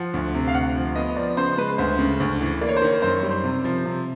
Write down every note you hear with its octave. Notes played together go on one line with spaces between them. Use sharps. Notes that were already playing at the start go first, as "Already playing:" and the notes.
Already playing: F3 F#5
D2
C3
F5
D2 F#5
F3
B3 D#5
F3 D5
C#3 C5
G#3 B4
D2 C5
C#3
D2
E3
A#3 D5
C#5
C5
D#3 C#5
F#2 C5
C#5
G3
C5
C3
F3
C3